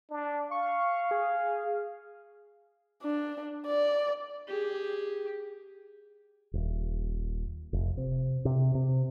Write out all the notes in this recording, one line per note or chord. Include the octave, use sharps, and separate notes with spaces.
D4
F5 C#6
G#4
D4
D5
G4 G#4
D#1
F1
C3
C3
C3